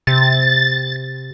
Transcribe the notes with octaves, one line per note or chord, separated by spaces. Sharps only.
C3 A6